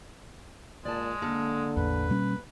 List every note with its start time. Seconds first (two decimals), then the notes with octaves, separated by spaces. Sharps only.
0.85 A#2 G#3 D5 A5
1.22 D3 A#3 A4
1.77 A1 E2 B4
2.10 B2 G3 C#4